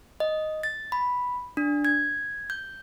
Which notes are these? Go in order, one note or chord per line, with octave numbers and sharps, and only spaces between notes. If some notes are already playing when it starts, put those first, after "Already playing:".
D#5
A6
B5
D4
G#6
G6